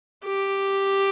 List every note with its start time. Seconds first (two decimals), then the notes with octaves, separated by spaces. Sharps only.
0.25 G4